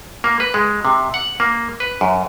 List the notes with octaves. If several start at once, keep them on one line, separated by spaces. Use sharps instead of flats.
A#3
B4
G#3
C3
F#5
A#3
B4
F#2